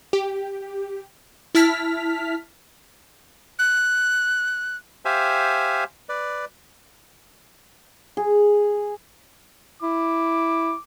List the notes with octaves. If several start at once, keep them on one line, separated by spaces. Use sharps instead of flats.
G4
E4 A5 F6 B6
F#6
G4 C5 E5 F5 G#5
B4 D5
G#4
E4 D6